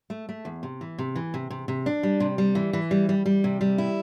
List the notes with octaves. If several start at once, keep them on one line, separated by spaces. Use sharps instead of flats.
A3
A3
E2
C3
E3
C3
E3
C3
C3
C3
D4
G3
C3
G3
E3
E3
G3
G3
G3
C3
G3
E4